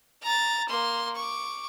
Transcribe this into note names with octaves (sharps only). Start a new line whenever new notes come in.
A#5 A6
A#3 C6
C#6 D6